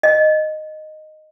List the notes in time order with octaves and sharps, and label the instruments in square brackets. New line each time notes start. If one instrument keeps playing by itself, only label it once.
[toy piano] D#5